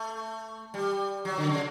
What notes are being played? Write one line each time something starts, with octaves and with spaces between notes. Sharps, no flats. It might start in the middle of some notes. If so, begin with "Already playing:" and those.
Already playing: A3
G3
F#3
D3
C#3